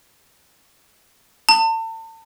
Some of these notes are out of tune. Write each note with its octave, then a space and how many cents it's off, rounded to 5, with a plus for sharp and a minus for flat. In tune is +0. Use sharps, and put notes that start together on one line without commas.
A5 +35